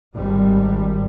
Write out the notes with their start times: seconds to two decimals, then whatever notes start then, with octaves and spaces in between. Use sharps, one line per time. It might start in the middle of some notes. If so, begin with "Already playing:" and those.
0.14 G#1 G3